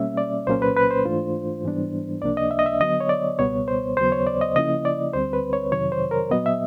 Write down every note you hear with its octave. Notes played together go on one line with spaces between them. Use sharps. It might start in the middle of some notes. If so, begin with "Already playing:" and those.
Already playing: B2 G3 A#3 C#4 E5
D5
C2 A#2 F#3 A#3 C#4 C5
B4
B4
C5
G#2 E3 A3 D4 F4
G#2 E3 G3 B3 D4
C#2 C3 F3 A#3 D4 D5
D#5
E5
D#5
E5
D3 F#3 B3 D#5
C#5
D5
C#2 B2 G3 B3 C#5
C5
D#2 C#3 F#3 B3 C5
C#5
D5
D#5
C#3 F3 A#3 C#4 E4 D#5
D5
D2 D3 G3 C4 C5
B4
C#5
F2 C3 D#3 F#3 C#5
C5
A#4
A#2 F#3 B3 D#5
E5